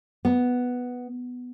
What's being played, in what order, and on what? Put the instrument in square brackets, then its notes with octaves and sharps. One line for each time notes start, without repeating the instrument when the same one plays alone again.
[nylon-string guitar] B3